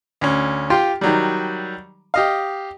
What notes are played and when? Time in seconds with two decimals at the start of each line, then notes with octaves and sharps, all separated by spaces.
0.21 D2 C#4
0.70 F4 G4 G5 C6
1.01 D#3 F#3 G3
2.14 G4 D#5 F5